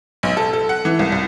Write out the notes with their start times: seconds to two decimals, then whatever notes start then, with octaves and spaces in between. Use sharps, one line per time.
0.23 B1
0.37 A4
0.53 A4
0.69 F#5
0.85 E3
0.99 C2
1.12 C2